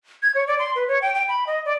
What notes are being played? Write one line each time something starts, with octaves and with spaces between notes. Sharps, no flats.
G#6
C#5
D5
C6
B4
C#5
G5
G5
B5
D#5
D5